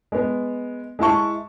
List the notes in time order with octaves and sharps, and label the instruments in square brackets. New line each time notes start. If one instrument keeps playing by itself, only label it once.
[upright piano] G#3 B3
G#3 E4 A5 C#6